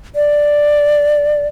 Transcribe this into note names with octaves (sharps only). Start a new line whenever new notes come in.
D5